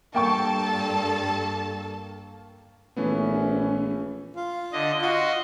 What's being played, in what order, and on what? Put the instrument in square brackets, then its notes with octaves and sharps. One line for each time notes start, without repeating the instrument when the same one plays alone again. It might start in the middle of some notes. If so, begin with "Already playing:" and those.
[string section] G2 A4 A5 [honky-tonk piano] A#3 G5 C#6
[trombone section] A#1 C#4 [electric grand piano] E3 A3 B3
[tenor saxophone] F4
[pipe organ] D3 D#5
[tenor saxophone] F4 [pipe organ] F#4 D#5